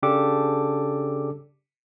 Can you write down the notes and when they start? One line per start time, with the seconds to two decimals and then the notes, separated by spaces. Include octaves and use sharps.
0.03 C#3 D4 G4 A4 D6